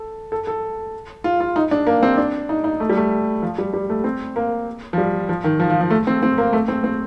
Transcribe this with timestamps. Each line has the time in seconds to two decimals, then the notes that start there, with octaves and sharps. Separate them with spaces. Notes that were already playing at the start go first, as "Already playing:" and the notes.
Already playing: A4
0.32 A4
0.47 A4
1.24 F4
1.40 F4
1.56 D#4
1.71 D4
1.87 A#3
2.03 C4
2.18 D4
2.49 D#4
2.64 D#4
2.80 A3
2.90 G3
2.97 A3
3.42 F3
3.58 G3
3.73 G3
3.90 A3
4.04 C4
4.36 A#3
4.93 F3
4.98 G3
5.29 F3
5.44 D#3
5.60 F3
5.70 F3
5.81 F3
5.90 A3
6.07 C4
6.23 C4
6.38 A#3
6.53 A3
6.68 C4
6.84 C4